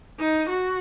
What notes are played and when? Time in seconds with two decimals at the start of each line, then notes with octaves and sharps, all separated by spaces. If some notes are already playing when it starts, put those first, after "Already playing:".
0.20 D#4
0.49 F#4